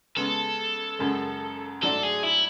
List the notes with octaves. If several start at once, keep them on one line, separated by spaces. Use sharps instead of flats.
C#3 G#3 B3 A4
F#2 C#3 G#3
G#2 F#3 A3 D4 A4
G#4
E4